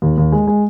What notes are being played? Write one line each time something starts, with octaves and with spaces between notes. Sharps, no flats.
D#2
D#2
G#3
G#3